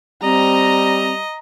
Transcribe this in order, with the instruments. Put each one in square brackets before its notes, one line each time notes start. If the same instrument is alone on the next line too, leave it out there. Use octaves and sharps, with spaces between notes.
[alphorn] G3 [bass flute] C4 [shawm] D#5 [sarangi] A#5